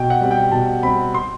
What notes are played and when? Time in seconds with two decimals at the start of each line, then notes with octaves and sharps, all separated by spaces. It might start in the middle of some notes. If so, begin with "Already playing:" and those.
Already playing: B2 G5
0.10 F#5
0.21 G3 C4
0.31 G5
0.52 B2 A5
0.83 G3 C4 B5
1.14 C6